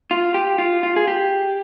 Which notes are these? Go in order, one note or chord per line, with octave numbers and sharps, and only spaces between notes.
F4
G4
F4
F4
G#4
G4